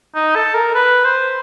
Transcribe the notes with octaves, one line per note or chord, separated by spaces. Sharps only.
D#4
A4
A#4
B4
C5